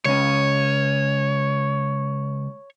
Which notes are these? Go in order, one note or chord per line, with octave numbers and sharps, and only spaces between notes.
C#2 C#4 C#5